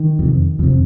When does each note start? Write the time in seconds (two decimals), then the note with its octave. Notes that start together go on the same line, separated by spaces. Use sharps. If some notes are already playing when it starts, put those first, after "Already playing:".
Already playing: D#3
0.19 F2 C3
0.59 F2 C3